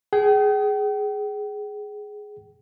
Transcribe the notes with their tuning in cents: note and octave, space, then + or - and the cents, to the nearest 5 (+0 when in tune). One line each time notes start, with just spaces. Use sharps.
G#4 +5 G5 -40